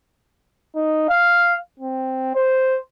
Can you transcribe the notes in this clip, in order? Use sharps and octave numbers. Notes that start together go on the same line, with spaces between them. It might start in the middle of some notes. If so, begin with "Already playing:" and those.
D#4
F5
C4
C5